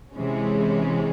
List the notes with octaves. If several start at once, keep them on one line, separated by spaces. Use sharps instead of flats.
C3 E3 G#3 C#4